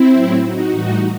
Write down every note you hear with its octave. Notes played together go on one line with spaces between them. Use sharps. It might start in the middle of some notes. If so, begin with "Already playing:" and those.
Already playing: C4 E4
A2 F#3
D#4 F#4
A2 E3 G3 D#4 F#4